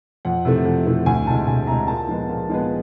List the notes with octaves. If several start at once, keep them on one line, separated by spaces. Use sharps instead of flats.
F2 F#5
C3 E3 A3 C4
F2
C3 E3 A3 C4
D2 G#5
C3 E3 G#3 A5
D2 G#5
C3 E3 G#3 A#5
A#2 A5
F3 G#3 B3
A#2
F3 G#3 B3